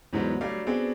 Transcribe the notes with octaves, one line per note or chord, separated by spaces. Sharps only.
E2 G#2 F#3 G3 B3
F#3 G3 A3 D4 G4 F5
B3 C4 D4 F#4 G#4 A4